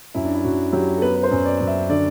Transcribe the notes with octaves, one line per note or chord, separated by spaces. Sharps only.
F#2 E4
D4
E4
F#2 F#4
F#3 G4
A4
B3 B4
B4
C5
F#2
D5
F#2
E5
D3 D5